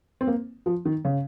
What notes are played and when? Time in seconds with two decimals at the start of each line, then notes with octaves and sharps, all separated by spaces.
0.21 C4
0.27 A#3
0.66 F3
0.85 D#3
1.05 C#3